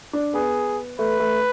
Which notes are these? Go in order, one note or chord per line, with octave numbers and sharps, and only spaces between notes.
D4
B3 G#4
A3 B4
A3